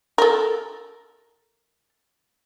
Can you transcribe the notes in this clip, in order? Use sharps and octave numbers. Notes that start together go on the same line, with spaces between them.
A4 A#4